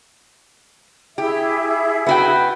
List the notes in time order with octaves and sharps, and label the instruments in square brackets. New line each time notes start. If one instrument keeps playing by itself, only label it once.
[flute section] E4 G#4 E5 [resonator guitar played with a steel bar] G4
[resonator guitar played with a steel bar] B3 F#4 G5